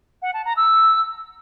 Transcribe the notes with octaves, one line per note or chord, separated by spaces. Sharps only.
F#5
A5
A#5
E6